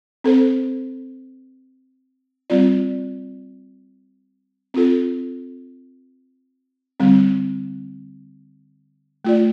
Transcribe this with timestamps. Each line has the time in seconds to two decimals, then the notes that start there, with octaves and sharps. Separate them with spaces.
0.24 C4 A4 C5
2.50 G3 C4 F4 D5
4.74 C4 F4 A4
7.00 D3 G3 C4
9.25 A3 F4 D5